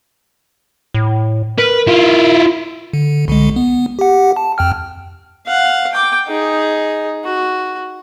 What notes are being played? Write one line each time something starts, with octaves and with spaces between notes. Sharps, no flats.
A2
A#4 B4
E4 F4
D3
C2 D3 G#3
B3
G4 F#5
A5
F2 G5 F6
F5 F#5
G5 D6
D#4 G#4
F#4